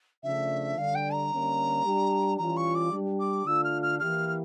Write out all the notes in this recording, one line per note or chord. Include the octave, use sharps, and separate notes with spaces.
C#3 F3 A3 D4 E5
D3 G3 D4 F5
G5
A#5
D3 G3 A#3 C#4
G3 D4 G4
E3 G3 C#4 F4 A#5
C#6
D6
G3 D4 G4
D6
D3 A3 D4 F4 E6
F6
F6
E3 A#3 E4 G4 F6
F6